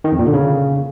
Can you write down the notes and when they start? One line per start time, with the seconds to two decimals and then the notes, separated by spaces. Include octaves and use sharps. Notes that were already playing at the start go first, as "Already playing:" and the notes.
0.04 D#3
0.12 F2
0.19 A#2
0.26 D3
0.34 C#3